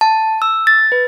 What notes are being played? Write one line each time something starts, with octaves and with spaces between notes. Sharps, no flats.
A5
E6
A6
B4